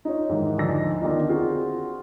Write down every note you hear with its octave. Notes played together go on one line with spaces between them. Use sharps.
D#4 F4 C#5
G#2 D#3 E3
D2 F3 D4 D#4 E6 A#6
D3 D#3 B3 D4 D#4 F4
C4 F4 F#4 G#4